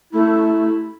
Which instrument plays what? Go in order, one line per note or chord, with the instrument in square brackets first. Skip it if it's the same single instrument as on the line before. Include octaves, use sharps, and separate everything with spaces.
[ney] A3 [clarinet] E4